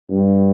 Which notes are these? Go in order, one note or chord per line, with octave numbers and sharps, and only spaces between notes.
G2